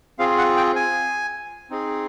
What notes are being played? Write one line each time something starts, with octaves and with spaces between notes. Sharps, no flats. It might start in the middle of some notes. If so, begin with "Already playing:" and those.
C4 F4 G#4 F5
F#5
G5
G#5
C4 D#4 G#4